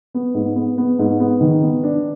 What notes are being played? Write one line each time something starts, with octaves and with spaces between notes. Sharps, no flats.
B3
G#2
B3
B3
G#2
B3
D#3
B3
D4